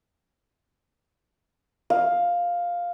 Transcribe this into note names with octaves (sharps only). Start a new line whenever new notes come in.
F5